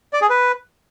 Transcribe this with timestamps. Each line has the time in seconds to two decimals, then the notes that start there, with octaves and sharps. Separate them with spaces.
0.13 D5
0.21 G#4
0.30 B4